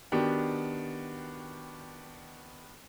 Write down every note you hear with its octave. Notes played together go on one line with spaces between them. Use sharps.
D#3 B3 D4 F#4 G4